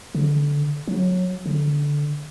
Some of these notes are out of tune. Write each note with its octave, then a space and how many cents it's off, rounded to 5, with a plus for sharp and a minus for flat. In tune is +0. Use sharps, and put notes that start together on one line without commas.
D3 -15
F#3 -20
D3 -10